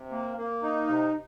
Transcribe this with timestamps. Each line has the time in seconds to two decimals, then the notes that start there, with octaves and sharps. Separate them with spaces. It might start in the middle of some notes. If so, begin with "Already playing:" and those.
Already playing: C3
0.11 A#3
0.37 A#3
0.63 D#4
0.88 C3